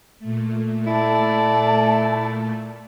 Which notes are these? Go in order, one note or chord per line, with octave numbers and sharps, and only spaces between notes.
A#2 A3
E4 A4 D5 A5